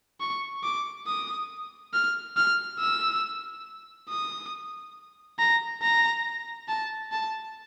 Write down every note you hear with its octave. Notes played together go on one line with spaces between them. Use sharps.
C#6
D6
D#6
F6
F6
E6
D#6
A#5
A#5
A5
A5